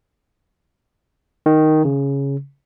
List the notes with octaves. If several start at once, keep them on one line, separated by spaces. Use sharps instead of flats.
D#3
C#3